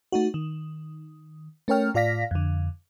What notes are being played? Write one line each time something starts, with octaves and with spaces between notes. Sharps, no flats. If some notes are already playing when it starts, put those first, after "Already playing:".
A3 D#4 F#4
D#3
A3 C#4 A#4 C#5 G5 F6
A2 F4 D5 F5 A#6 B6
F2 D3